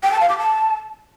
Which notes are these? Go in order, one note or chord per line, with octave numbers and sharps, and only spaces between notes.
G5
A5
F5
D6
A5